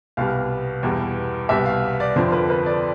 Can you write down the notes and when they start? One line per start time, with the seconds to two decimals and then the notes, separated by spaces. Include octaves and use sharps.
0.17 C2 B2 G3 F5
0.83 E2 B2 G3
1.49 C2 B2 G3 E5
1.66 F5
2.00 D5
2.16 F2 D3 F3 C5
2.32 B4
2.50 B4
2.66 D5